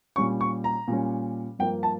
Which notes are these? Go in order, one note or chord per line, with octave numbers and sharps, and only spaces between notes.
A#2 G3 C#4 C#6
C#6
A#5
A#2 G3 C#4
G2 F3 A#3 G5
A5